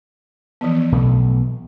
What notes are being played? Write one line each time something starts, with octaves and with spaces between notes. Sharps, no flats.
E3 F3 B3
B1 B2 A3